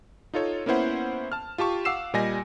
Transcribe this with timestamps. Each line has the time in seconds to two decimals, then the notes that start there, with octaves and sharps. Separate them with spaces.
0.34 D#4 F4 A4 C#5
0.66 A#3 B3 C#4 E4 C5 F#5
1.32 A5 F6
1.58 F4 G4 A5 C#6
1.85 F5 F#5 D6 E6 C7 E7
2.14 A#2 G3 D#5 G#5 A#6